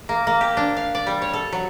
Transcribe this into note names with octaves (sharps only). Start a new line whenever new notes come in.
A#3
A#3
G4
D4
F5
D5
G3
C#5
A4
F#3